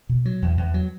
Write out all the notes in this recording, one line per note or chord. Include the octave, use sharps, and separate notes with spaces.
B2
F#3
E2
E2
F#3